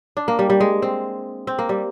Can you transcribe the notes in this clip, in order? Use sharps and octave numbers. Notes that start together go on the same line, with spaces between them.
D4
A#3
G3
G3
G#3
C4
C4
A#3
G3